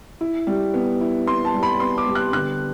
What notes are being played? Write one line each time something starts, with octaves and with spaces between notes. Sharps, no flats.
E4
G3
B3
E4
B3 C6
A5
G3
B5
B3 C6
D6
G3
F#6
D3 F#6